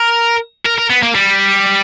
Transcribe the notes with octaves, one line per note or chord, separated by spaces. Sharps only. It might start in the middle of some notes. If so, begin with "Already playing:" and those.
Already playing: A#4
A#4
A#4
B3
A#3
G3